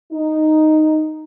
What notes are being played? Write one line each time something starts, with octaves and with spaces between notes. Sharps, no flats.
D#4